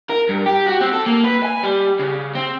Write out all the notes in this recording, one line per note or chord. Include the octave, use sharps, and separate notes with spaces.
A#4
G2
G4
F#4
C4
A4
A#3
B4
G#5
G3
C#3
C4